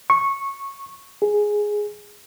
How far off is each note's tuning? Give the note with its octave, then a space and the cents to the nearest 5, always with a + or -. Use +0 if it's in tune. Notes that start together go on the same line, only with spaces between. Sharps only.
C#6 -10
G#4 +0